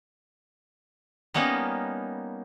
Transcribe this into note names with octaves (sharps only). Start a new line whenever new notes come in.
G3 A#3 B3 C#4 D#4